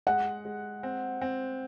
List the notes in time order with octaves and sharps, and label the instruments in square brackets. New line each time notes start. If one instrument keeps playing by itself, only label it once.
[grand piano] G#3 [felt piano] F#5
[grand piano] G#3
C4
C4